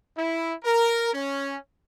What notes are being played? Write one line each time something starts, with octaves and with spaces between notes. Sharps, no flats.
E4
A#4
C#4